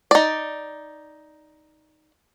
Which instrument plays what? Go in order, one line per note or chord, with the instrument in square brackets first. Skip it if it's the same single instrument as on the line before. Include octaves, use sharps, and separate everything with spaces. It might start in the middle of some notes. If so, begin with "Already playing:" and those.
[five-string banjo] D#4 D5